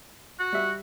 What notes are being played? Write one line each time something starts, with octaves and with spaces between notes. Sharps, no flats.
F#4
G3 E5